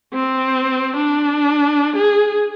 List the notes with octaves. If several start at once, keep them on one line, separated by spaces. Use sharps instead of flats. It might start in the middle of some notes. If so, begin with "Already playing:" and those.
C4
D4
G#4